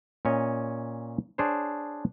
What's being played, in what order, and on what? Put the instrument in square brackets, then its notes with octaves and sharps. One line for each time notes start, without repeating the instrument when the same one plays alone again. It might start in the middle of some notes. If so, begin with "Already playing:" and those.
[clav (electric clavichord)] A#2 C#4 C#5 D#5
D4 G#4 C5 C#5